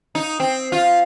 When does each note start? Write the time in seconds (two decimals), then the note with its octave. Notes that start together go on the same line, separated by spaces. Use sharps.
0.15 D#4
0.40 C4
0.72 F4